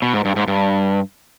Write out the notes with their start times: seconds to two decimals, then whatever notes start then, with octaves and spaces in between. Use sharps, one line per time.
0.02 B2
0.13 G#2
0.25 G2
0.36 G#2
0.48 G2